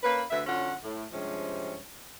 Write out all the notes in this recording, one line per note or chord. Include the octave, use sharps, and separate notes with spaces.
A#3 C#4 B4
D2 B4 E5
D3 F#3 C#4 F4 F#5
A2
G2 C3 F3 G#3 C#4